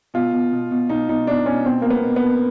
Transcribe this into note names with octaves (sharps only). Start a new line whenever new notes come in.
B2 F4
B2
B2
B2
B2 D#4
B2 D#4
B2 D4
B2 C#4
B2 C4
B2 A#3
B3
B2
B3
B2